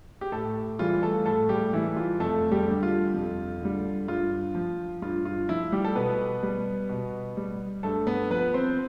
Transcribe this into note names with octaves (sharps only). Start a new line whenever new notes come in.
G4
A2 A3 A4
E3 G3 F4
A3 A4
A2 A3 A4
G3 G4
E3 G3 E4
F4
F2 A3 A4
G3 G4
D3 G3
F4
F2
D3 G3
G2 F4
F3
G2 F4
F4
F3 E4
G3 G4
A4
B2 B3 B4
G3
B2
G3
G2 A3 A4
B3 B4
F3 B3 B4
C4 C5